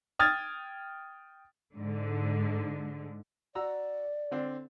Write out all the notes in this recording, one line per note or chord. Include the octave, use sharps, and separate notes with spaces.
G5 D#6 F6 G#6 A6
G#2 D3
F#4 D5 A#5 E6
D3 C4 D4